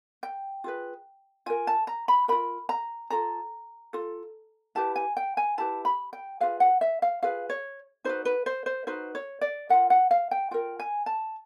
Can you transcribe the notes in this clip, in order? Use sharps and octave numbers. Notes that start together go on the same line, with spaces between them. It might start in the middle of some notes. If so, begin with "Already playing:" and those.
G5
F4 G#4 B4
F4 A#4 G#5
A5
A#5
B5
F4 A#4 B5
A#5
F4 A4 A#5
F4 A4
E4 G4 B4 A5
G#5
G5
G#5
E4 G4 B4 A5
B5
G5
F4 G#4 B4 F5
F#5
E5
F5
F4 G#4 B4 F5
C#5
D#4 F#4 B4 C5
B4
C5
C5
D#4 F#4 B4 C5
C#5
D5
F4 A#4 F#5
F#5
F5
G5
F4 A#4 G5
G#5
A5